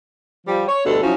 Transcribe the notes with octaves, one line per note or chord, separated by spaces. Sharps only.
F3 G3 G4
C#5
D2 B2 G3 A4
F3 F#3 C#4 D#4 E4 F#4